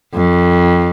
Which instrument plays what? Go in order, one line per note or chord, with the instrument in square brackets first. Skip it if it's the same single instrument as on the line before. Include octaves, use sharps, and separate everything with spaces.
[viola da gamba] F2